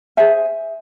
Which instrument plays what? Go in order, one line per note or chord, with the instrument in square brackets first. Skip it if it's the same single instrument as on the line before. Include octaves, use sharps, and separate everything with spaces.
[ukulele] G#4 C5 E5 G#5